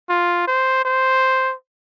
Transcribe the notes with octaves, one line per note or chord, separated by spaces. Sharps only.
F4
C5
C5